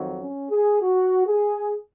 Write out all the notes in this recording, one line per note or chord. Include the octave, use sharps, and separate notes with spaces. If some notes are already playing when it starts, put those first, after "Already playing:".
Already playing: F2 D#3 F#3
C#4
G#4
F#4
G#4